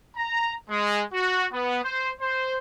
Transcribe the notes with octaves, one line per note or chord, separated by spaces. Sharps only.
A#5
G#3
F#4
B3
C5
C5